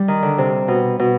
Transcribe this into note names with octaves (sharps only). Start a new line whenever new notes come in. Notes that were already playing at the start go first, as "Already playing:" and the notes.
Already playing: G3
D#3
D3
C3
B2
B2